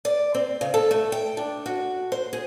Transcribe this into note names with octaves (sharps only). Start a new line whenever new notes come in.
D5
C4
C#3
A4
A3
G5
D4
F#4
C5
G#4